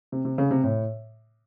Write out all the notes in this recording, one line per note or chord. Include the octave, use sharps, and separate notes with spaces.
C3
C3
C#3
C3
A2